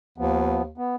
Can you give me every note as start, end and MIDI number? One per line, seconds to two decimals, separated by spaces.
0.18 0.74 39
0.18 0.63 53
0.18 0.63 59
0.78 0.96 59